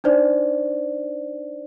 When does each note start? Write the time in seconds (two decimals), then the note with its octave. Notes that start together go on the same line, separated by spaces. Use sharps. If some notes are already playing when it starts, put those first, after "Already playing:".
0.04 D4 D#4 C5 D5